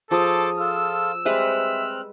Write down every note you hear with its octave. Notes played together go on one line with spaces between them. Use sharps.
F3 G#4 A4 C5 C#5 A5 D6 D#6
F4 A4 E6
G3 G#3 C4 B4 C5 E5 F6 F#6